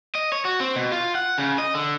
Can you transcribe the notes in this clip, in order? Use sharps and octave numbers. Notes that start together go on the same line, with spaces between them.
D#5
C#5
F#4
C4
B2
F4
F#5
C#3
D#5
D3